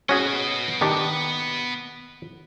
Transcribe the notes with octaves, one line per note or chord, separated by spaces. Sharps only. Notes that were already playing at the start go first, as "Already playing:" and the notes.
B3 C#4 F#4 G#4 D#5
D#3 D4 G4